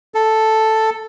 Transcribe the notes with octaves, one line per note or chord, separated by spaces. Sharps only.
A4